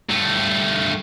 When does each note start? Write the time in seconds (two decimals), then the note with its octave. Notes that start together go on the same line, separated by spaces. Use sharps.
0.09 G2 A3